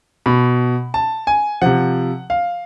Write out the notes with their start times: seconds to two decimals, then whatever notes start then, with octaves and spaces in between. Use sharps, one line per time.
0.26 B2 B5
0.94 A5
1.27 G#5
1.62 C3 F3 F#5
2.30 F5